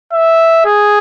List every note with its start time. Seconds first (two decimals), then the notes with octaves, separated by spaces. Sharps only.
0.13 E5
0.65 G#4